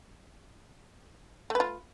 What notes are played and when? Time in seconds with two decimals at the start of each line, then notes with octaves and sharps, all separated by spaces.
1.50 A3
1.55 B4
1.60 F4